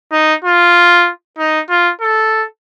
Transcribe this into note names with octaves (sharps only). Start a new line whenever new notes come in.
D#4
F4
D#4
F4
A4